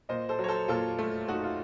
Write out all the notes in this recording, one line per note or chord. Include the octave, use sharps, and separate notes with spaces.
A#2 C5 D#5
A4 C5
F#3
C#5
A4 C5
A#2 F4 A4
A3
A3 D#4 F#4
F4